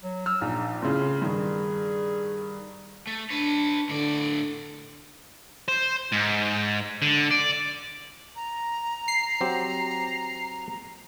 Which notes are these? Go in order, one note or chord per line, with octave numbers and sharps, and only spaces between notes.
F#3
E6 F6
A#1 D#4
A2 C#3 F4
G2 D#3 G#4
A3
D4 B4 C#5
A2 D3 D5
C5
G#2
D3
D5
A#5
C7
F#3 C4 G4